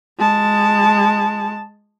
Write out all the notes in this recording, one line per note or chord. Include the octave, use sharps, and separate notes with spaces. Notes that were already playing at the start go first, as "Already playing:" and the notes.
G#3 A5